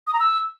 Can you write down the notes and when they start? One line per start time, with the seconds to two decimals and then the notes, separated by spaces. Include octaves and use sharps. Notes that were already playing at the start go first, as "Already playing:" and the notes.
0.07 D#6
0.13 A#5
0.20 E6